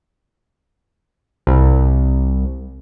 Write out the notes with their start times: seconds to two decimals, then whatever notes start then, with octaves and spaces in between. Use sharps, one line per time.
1.47 C2